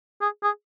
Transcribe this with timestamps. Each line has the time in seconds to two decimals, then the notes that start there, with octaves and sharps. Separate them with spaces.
0.22 G#4
0.43 G#4